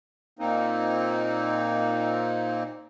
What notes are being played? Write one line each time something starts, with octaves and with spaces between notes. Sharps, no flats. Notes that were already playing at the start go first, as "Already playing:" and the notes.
A#2 A#3 C4 D#4